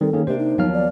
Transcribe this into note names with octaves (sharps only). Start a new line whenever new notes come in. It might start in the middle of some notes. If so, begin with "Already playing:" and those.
D#3 G3 C4 A4
D#3 A#3 C#4 G#4
C3 A#3 D4 G4 C5
D#4
D#2 F3 F#3 B3 F5 F6
D5